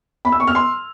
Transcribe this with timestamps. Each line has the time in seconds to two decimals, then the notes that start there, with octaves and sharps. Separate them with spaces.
0.25 B5
0.32 E6
0.40 C#6
0.47 F6
0.55 C6